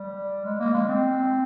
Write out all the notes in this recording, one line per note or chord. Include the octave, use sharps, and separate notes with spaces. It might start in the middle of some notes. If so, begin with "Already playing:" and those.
Already playing: G3
G#3
A#3
G#3
C4